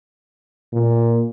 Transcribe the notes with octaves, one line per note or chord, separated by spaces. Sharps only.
A#2